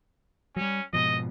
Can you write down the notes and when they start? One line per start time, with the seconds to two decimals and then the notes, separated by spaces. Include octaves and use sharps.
0.56 F#3 G3 C#4
0.93 G#2 B2 F3 D#5